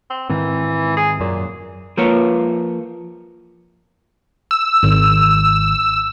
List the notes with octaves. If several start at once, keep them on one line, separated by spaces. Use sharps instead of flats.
C4
G#2 D#3 E3 C4
G#4
F#2 A#2 F#3
F3 A#3 F4 A#4 B4 C#5
E6
G#1